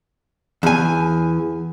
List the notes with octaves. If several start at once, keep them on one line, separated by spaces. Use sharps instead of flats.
E2 G#5